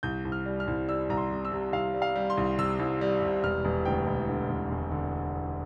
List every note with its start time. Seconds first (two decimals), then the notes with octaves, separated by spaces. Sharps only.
0.03 C2 G6
0.25 C2
0.32 F6
0.46 G3
0.60 F6
0.68 C2
0.89 G3 E6
1.09 C2 A#5
1.17 C6
1.31 C3
1.45 E6
1.52 C3
1.73 C2 F5
1.94 G3
2.02 F5
2.15 G3
2.30 C6
2.37 C2
2.59 C3 E6
2.79 C2
3.01 G3
3.22 C3
3.43 E1 F6
3.65 E1
3.85 D2 G5
4.07 E1
4.29 D3
4.49 E1
4.71 E1
4.91 D3